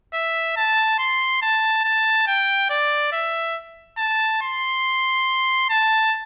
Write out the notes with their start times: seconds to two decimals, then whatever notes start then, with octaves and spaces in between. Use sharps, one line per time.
0.14 E5
0.57 A5
0.99 C6
1.42 A5
1.84 A5
2.27 G5
2.70 D5
3.12 E5
3.98 A5
4.42 C6
5.69 A5